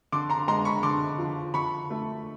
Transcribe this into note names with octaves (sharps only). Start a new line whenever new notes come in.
D3 C6 D6
A#5 C6
G#3 A#5 C6
B5 C#6
D3 C6 D6
F3
D3 B5 C#6
A3